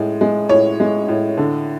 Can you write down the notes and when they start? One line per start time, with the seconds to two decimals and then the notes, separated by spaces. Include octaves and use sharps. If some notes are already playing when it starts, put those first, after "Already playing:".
Already playing: A2 G#3
0.21 G#3
0.49 A2 C#5
0.80 G#3
1.08 A2
1.37 D3